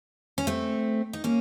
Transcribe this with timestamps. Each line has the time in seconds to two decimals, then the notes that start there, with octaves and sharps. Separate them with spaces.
0.38 C#4
0.47 A3 C4
1.13 D#4
1.24 A#3 C#4